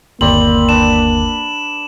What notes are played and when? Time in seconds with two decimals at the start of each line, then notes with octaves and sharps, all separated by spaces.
0.21 G1 D#2 A#3 C4 D5 B5 F#7
0.69 D4 B4 E7